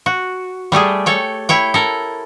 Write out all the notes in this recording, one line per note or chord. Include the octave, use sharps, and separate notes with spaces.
F#4
G3 A3 G4 G#4
A4 C#5 G5
E4 C#5 G5
A4 A#4